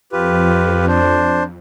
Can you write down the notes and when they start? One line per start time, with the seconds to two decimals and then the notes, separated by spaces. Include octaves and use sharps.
0.12 F2 F4 G4 B4
0.87 D4 C5